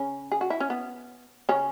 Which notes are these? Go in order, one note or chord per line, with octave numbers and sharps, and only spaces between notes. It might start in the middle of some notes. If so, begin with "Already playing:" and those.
Already playing: C#3 C#4
G#4
F#4
E4
C#4
B3
C#3 C#4